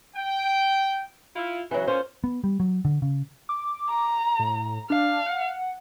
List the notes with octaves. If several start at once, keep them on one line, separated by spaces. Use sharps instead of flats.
G5
E4 F4
C#3 E3 F#3 F#4
A#3 C#4 F4 C5
B3
G3
F#3
D3
C#3
D6
A#5
A2
D4 F5
F#5